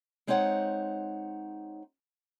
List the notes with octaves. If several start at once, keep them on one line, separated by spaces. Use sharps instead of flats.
G#3 C4 D#4 C#5 F#5